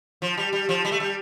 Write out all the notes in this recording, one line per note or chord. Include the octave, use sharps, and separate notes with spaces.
F3
G3
G3
F3
G3
A3
G3